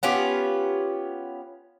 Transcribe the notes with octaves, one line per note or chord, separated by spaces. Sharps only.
B3 C#4 F4 G4